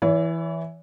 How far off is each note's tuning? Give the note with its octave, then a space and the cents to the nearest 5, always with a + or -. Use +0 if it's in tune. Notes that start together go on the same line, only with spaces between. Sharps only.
E3 +0 C#5 +40